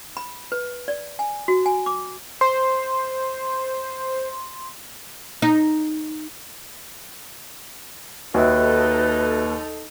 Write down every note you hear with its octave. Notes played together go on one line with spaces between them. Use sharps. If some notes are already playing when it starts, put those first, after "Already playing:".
B5
B4
D5
G#5
F#4
G#5
D6
C5 C6
D#4
D#2 D#4 F#4 A4 B4 D#5 E5